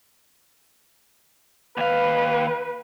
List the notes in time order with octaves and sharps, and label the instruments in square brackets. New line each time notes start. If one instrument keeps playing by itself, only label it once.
[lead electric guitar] D#2 F5 [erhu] B4